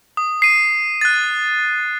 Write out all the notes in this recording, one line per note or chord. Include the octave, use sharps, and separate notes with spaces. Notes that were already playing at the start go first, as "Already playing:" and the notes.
D#6
C7 D#7
F#6 A6